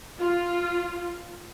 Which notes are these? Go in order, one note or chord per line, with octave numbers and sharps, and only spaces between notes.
F4